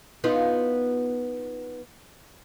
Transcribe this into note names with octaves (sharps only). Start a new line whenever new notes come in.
B3 D#4 F4